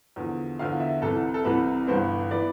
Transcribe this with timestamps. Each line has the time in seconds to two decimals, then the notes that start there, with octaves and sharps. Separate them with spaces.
0.16 E2 D3 F3
0.59 E2 D3 F3 F5
0.80 E5
1.02 C2 C3 E3 A4
1.34 A4
1.45 C2 C3 E3 B4
1.87 G1 G2 E3 B3 C5
2.31 E3 B3 D5